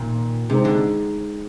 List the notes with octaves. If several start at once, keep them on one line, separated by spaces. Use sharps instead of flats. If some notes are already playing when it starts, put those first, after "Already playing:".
Already playing: A#2 D#3
C3 G#3 D#4 G#4 C5
D3